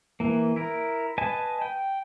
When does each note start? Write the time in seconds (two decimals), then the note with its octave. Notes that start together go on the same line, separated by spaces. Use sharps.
0.20 E3 A#3
0.56 E4 A#4
1.18 B4 D#5 G#5 A5
1.62 G5